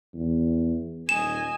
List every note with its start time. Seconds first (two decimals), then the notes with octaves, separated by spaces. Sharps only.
0.14 E2
1.09 D#1 D#5 G#5 E7